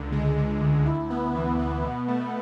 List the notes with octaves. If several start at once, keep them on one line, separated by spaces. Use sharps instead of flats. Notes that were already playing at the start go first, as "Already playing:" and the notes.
Already playing: C#2 D3
G#3
D3
D2
E4
B3
E3
B3
B2
A3